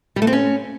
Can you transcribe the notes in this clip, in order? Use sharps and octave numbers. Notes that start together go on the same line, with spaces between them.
G3
A3
C4
C#4